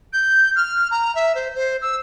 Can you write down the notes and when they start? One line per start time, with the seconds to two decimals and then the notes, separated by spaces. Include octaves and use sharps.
0.13 G6
0.56 F6
0.91 A#5
1.15 E5
1.35 C5
1.55 C5
1.81 E6